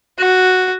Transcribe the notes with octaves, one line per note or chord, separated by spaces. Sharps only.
F#4